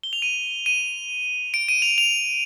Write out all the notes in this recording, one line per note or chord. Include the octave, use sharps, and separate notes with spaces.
G7
F7
D#7
D#7
D7
D#7
F7
F7